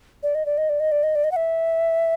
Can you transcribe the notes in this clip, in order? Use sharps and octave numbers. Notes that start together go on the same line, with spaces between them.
D5
D#5
D5
D#5
D5
D#5
D5
D#5
D5
D#5
F#5
E5